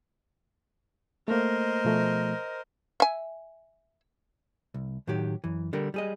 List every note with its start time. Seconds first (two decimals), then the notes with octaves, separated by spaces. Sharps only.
1.28 A3 A#3 A#4 C5 D#5
1.85 B2 F3 A3
3.00 E5 G#5
4.74 C2
5.07 A2 D#3 F#3 G4
5.44 F#2 E3
5.73 D3 G3 A#4
5.94 G3 G#4 D#5